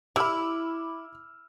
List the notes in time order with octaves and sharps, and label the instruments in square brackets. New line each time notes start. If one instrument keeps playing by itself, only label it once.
[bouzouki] E4 [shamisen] G4 B5 [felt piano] D6 E6 F6